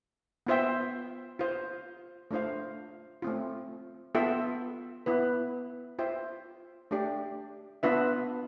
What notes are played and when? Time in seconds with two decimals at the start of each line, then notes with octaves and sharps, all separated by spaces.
0.47 B3 F4 C5 E5 G5
1.39 F4 C5 F5
2.31 A3 D4 F4 C5 F5
3.22 A3 C4 F4
4.15 B3 F4 A4 E5 G5
5.06 B3 E4 B4
5.99 F4 C5 E5 G5
6.91 A3 D4 G4 D5
7.83 B3 D4 F4 B4 E5